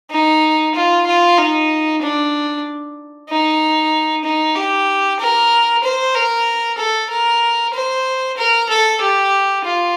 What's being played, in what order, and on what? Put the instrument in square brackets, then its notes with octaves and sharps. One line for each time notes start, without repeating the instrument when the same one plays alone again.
[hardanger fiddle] D#4
F4
F4
D#4
D4
D#4
D#4
G4
A#4
C5
A#4
A4
A#4
C5
A#4
A4
G4
F4